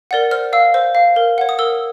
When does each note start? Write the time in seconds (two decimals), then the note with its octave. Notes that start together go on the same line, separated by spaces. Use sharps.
0.11 A#4 D5 F#5
0.31 C5 F6
0.53 F5 E6
0.74 C5
0.95 F5
1.16 A#4
1.38 C#5 F#5
1.49 D#6
1.59 A#4 E6